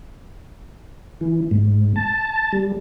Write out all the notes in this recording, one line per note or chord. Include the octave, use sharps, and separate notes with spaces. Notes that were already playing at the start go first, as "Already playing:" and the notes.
E3
G#2
A5
G3